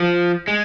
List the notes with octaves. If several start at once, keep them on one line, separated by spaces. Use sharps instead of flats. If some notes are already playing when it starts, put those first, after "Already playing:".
Already playing: F3
G#3